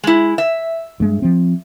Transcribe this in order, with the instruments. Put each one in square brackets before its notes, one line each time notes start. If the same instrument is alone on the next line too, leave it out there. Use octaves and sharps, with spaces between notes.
[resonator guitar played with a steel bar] G#3 E4
E5
[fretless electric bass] G2 G#3
F3 C4